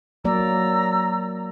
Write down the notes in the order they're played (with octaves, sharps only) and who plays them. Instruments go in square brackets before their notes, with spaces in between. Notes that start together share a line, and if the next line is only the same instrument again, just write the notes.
[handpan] F#3 A#3 D5 [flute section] A#5 E6